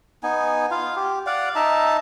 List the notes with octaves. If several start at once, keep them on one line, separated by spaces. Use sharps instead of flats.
B3 D#4 G#5
F4 F5
G4
D5 F5 F#5
D#4 E5 A5 A#5